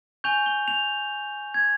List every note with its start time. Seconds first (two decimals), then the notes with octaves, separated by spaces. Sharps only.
0.24 G#5 C#6 G6 F7
0.46 G7
0.68 F7
1.54 G#6